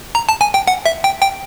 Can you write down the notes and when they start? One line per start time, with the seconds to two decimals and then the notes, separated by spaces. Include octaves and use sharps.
0.15 A#5
0.29 A5
0.41 G#5
0.54 G5
0.68 F#5
0.86 E5
1.04 G5
1.22 G5